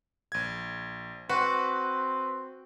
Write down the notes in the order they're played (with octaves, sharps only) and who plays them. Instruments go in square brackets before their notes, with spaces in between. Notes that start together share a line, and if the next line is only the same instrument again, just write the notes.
[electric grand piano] A#1 G#6
[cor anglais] C4 [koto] F#4 [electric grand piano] B4